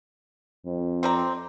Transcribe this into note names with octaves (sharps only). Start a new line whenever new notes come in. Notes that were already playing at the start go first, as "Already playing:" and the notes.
F2
C4 D5 A#5